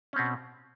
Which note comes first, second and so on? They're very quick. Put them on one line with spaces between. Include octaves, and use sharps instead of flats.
C#4 C4 B2